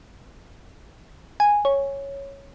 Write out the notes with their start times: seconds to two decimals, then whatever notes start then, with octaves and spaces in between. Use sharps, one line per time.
1.40 G#5
1.65 C#5